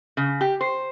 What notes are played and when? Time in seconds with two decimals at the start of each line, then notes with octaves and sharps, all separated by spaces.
0.17 C#3
0.41 G4
0.61 C5